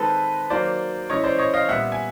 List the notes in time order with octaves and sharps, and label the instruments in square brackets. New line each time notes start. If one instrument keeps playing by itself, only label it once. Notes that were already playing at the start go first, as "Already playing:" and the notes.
Already playing: [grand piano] D#3 G#3 C4 D#4 A4 B4
D#3 F#3 A#3 C5 D5
E3 G#3 C#4 E4 C#5 D#5
C5 D5
C#5 D#5
D#5 F5
A#2 G3 B3 E5 F#5
G#5